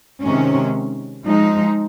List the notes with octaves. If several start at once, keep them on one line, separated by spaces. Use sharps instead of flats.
C3 D#3 G#3 C#4
F3 G#3 D#4